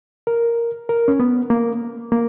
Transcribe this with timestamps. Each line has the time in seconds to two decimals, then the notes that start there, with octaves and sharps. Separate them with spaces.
0.27 A#4
0.89 A#4
1.08 C#4
1.20 B3
1.50 A#3
2.12 A#3